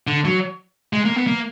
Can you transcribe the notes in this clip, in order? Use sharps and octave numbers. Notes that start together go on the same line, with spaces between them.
D3
F#3
G#3
A#3
B3
A#3